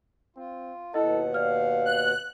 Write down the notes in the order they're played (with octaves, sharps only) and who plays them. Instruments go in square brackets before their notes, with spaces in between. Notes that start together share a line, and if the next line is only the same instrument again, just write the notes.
[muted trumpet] C4 [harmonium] F4
[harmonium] D#2 B2 F#5 [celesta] E4 D#5 [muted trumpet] A4
[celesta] D5 F6 [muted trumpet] F5
[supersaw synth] F#6